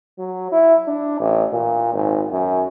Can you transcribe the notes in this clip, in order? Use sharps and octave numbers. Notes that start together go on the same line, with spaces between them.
F#3
E4
D4
A1
A#2
G#1
F#2